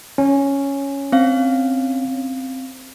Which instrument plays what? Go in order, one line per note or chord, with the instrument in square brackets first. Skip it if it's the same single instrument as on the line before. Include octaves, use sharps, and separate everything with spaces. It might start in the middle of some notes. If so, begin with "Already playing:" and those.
[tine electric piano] C#4
[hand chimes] C4 F5